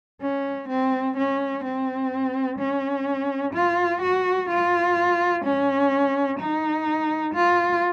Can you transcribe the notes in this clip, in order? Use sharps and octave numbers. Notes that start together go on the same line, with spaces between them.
C#4
C4
C#4
C4
C#4
F4
F#4
F4
C#4
D#4
F4